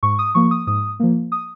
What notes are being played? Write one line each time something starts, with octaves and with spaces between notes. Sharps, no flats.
G#2 C#6
D#6
F3 A#3 C#6
D#6
G#2 D#6
F3 A#3
D#6